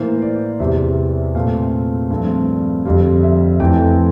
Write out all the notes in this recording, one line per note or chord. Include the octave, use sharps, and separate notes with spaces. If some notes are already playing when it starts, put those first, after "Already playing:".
Already playing: A2 E3 A#3 C5
D5
E2 C3 G3 C4 E5
A#2 A3 C4 F5
G2 F3 A3 C4
F2 D3 G3 C4 F5
E5
F2 E3 A3 C4 G5